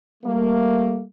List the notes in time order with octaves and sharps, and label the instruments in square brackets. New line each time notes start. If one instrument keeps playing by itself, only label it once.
[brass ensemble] G3 A3 A#3